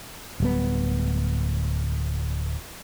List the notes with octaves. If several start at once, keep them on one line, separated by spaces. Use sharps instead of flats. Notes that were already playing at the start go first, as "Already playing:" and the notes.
D1 G3 B3